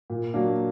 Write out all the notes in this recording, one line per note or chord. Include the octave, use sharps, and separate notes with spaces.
A#2
F#3 A#3 D4